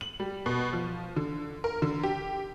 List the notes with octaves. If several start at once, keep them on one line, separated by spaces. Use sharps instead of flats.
F#7
G3
B2
F3
D3
A#4
D3
G4